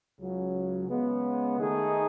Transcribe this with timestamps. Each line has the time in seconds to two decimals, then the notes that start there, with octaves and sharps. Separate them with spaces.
0.19 C#2 C#3 F#3
0.89 C#3 G#3 B3
1.58 D#3 A3 D#4 G#4